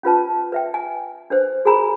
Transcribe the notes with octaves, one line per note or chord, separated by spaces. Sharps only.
C#4 F4 B4 A5
B4 E5 G5
G#5
D4 B4 C5
F#4 G#4 A#4 G#5 A#5 B5